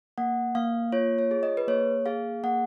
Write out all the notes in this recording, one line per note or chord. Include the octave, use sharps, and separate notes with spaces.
A#3 F#5
A#3 F5
F4 C#5
C#5
G#4
D#5
B4
A#3 C#5
G#4 F5
A#3 F#5